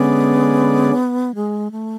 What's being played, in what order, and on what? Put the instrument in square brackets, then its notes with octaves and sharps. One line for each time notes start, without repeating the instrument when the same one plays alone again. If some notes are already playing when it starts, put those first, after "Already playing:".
Already playing: [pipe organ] D3 G#3 C#4 G#4 D5 [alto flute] B3
[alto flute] G#3
A3